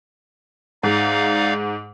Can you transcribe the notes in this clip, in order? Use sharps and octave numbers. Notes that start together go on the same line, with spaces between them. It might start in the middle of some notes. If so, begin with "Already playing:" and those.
G#2 D#4 D5 F5